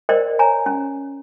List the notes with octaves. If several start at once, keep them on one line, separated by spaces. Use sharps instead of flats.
A#4 C5 D5 D#5 G5
C#5 G#5 A#5
C#4